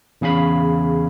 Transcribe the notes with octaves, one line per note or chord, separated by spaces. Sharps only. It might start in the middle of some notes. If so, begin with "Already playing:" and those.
E2 C#3 G#4 F5 B5